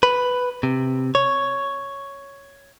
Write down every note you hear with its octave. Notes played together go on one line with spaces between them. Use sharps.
B4
C3
C#5